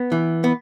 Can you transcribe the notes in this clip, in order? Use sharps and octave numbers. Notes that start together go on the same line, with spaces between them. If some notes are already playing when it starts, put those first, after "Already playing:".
Already playing: B3
E3
B3